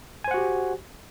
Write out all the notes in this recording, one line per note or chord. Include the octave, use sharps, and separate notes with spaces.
F#4 G4 C5 F#5 G#5